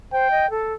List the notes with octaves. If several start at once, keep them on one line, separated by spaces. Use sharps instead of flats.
C5 G5
D#5
A4